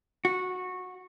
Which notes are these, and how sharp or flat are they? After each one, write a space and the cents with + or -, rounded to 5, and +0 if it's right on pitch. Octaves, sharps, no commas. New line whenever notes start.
F#4 -15